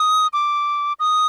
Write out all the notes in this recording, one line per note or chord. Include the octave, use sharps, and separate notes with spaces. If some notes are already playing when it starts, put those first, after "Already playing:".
Already playing: D#6
D6
D#6